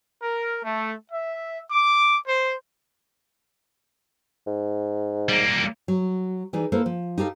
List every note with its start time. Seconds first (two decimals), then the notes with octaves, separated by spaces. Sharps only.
0.23 A#4
0.64 A3
1.12 E5
1.71 D6
2.28 C5
4.47 G#2
5.29 G3 A#3
5.88 F#3
6.53 E3 D#4 G#4 D5
6.72 A#3 E4 A4 B4 C5
6.86 F3
7.18 D#4 G4 A4 F5